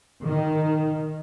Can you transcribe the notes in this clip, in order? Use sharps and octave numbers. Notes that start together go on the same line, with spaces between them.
D#3